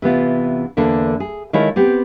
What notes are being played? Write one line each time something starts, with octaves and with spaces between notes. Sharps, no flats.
C3 E3 B3 F4
E2 D3 A#3 D4 A4
G#4
D#3 G#3 E4 F4 A4 C#5
B3 C4 G4